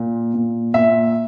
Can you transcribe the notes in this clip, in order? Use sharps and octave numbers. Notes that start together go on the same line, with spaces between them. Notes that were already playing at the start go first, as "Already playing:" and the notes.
Already playing: A#2
A#2
A#2 E5